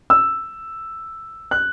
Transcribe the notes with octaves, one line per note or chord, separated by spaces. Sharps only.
E6
F#6